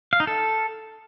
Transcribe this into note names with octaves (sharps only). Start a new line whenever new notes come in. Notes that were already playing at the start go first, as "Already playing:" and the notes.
F5
D#4
A4